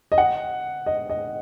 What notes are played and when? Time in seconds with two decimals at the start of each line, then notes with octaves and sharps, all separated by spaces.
0.12 D#5
0.18 F#5
0.86 D#5
1.10 D#5